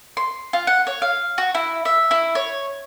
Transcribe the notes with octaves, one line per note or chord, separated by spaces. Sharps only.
C6
F4
F#5
C#5
F5
F#4
E4
E5
E4
C#5